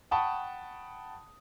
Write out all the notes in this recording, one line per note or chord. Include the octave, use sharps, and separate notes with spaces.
F#5 G5 A5 B5 C#6 D#6